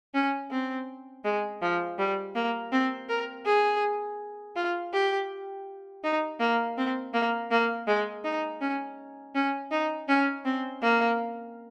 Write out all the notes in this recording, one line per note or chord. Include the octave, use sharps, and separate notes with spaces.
C#4
C4
G#3
F3
G3
A#3
C4
A#4
G#4
F4
G4
D#4
A#3
C4
A#3
A#3
G#3
D#4
C#4
C#4
D#4
C#4
C4
A#3